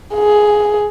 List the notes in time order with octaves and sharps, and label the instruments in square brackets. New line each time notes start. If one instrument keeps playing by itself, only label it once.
[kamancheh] G#4